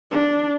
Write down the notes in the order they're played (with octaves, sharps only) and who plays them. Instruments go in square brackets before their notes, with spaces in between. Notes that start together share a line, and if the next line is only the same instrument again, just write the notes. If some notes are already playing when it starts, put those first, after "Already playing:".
[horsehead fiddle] D4